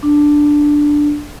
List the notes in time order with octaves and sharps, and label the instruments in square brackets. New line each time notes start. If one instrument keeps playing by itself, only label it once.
[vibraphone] D4